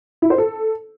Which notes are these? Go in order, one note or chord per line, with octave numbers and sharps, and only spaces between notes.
E4
C5
A4